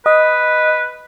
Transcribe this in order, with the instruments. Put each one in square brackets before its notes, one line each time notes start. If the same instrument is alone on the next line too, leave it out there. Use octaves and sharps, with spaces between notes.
[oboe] B4 [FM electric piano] D#5